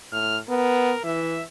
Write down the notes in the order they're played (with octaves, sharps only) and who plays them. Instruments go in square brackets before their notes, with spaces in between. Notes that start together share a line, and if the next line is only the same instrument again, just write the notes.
[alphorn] A2 [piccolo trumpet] F6
[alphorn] B3 [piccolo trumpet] A#4
[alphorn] E3 [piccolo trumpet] E5